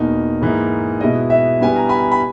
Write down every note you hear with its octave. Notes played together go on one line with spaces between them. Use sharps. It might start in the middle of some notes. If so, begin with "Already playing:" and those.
Already playing: E2 B2 A#3 D#4
G#2 E3 A#3 D#4
B2 G#3 B3 E4 D#5
E5
G2 G3 B3 E4 G#5
A#5
G#5 B5
B5